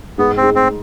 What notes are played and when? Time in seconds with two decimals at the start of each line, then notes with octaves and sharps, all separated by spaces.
0.18 G#2 B3
0.37 C4
0.42 G#2
0.55 C4